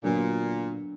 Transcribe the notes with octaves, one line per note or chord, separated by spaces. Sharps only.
A#2 D3 F#3 B3